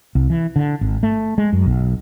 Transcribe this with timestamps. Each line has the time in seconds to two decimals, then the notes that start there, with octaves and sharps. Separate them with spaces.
0.15 C2
0.30 E3
0.56 D3
0.81 G#1
1.03 A3
1.38 G#3
1.53 F#2
1.66 B1